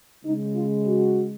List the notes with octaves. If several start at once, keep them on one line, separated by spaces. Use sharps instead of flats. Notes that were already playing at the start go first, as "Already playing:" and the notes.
C#3 G#3 D#4
F4
F#4